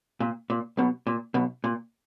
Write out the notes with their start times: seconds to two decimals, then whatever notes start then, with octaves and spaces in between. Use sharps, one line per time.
0.20 A#2
0.50 A#2
0.77 B1 B2
1.07 A#2
1.34 B1 B2
1.64 A#2